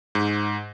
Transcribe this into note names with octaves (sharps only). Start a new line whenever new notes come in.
G#2